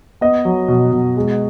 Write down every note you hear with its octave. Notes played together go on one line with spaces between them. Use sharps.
B3 D#5
F#3
B2
B2
G#3